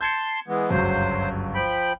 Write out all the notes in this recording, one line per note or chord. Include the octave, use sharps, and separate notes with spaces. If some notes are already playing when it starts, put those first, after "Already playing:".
A5 C6 G6 G#6 C#7
E3 G#3 B3
G1 C#2 F#2 F#3 C5
F3 G5 B5